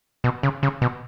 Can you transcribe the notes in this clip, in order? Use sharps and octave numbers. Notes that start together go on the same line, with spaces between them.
B2
C#3
C#3
B2